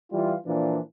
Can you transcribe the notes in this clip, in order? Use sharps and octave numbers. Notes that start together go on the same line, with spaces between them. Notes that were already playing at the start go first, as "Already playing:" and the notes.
E3 G3 F4
A#2 E3 F3 D4